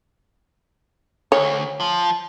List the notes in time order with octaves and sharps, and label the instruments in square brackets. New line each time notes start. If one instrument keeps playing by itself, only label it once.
[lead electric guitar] D2 [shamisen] C#5
[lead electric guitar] F3